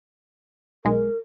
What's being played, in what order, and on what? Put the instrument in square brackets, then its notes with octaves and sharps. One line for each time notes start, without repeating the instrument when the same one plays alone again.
[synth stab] B1 G#3 [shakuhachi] A#4